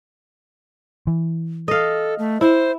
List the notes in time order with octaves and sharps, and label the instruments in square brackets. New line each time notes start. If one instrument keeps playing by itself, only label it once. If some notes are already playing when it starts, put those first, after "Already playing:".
[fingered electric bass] E3
[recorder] A4 [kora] D#5 F5
[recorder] A3
[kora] E4 [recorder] C5